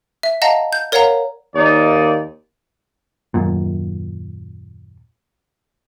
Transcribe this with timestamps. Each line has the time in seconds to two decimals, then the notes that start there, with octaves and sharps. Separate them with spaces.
0.23 E5
0.42 D#5 F5 F#5 A5 A#5 A#6
0.73 G6
0.92 A#4 C#5 D5 F5 F#5 A#5
1.55 D#2 A#3 D#4 D5
3.34 D#1 F#2 A#2